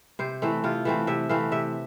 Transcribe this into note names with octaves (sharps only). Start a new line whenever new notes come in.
C3 C5
E3 A3 C4
C3 F4
E3 A3 C4
C3 E5
E3 A3 C4 F5
C3 E5